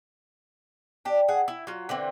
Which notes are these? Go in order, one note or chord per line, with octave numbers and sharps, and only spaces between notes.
D4 G4
G#4 F#5
E4
F#3 F4
D3 E3 C4